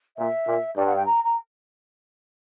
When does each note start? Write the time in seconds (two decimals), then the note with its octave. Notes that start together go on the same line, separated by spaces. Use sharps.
0.17 A#2 E5
0.47 A#2
0.76 G2 D5
0.87 F#5
0.96 G5
1.06 A#5
1.24 A#5